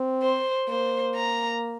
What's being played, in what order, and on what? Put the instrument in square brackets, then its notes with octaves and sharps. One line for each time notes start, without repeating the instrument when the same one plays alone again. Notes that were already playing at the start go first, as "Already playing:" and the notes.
Already playing: [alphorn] C4
[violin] C5
[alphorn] A#3 [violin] C5
[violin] A#5